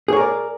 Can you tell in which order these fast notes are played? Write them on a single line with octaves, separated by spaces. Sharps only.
G#4 C#5 A#4 D5